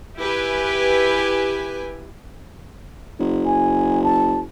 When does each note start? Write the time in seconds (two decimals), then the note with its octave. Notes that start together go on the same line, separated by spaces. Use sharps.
0.19 E4 G4 B4 G#5
3.19 F#1
3.45 G#5
4.03 A5